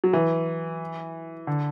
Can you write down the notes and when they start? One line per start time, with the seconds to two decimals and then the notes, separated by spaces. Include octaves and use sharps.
0.04 F#3
0.13 E3
1.47 D3